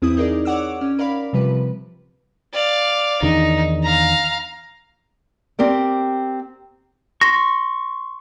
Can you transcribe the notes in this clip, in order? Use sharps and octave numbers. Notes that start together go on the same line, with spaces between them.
E2 C4 E4 D#6
D#4 G#4 A#4 D5
C#5 D5 F#5 D6 E6
C#4
A#4 D5 F5 B5
C3 F3 G3 B4
D5 F5
E2 D#3 D4 D#4
F5 A#5
C4 G4 A#4 D5
C6 C#6 A#6